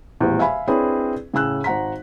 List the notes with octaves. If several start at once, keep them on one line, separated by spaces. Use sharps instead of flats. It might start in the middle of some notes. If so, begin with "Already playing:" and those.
D#1 A1 E2
E5 F5 G#5 B5
C4 D4 E4 G#4 B4 C#5
A2 C#3 G#5 E6 F#6
G#1 F#5 A#5 B6